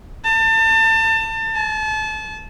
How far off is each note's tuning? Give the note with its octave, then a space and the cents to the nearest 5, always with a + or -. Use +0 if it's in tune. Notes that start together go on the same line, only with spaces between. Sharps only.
A5 +30
A5 -30